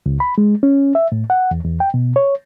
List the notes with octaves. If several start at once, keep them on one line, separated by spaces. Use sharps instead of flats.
C#2
B5
G#3
C#4
E5
A2
F#5
E2
E2
G5
B2
C#5